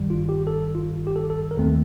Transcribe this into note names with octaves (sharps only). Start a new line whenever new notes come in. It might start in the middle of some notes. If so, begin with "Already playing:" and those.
Already playing: G1 G2 D#3 G3
F4
G4
A4
F4
G4
A4
A4
A#4
D#2 D#3 A3 C4 A4